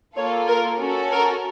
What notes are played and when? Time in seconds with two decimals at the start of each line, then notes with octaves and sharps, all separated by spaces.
0.16 A#3 F4 A4 C#5
0.47 A#4
0.79 C#4 F#4 A4
1.12 A#4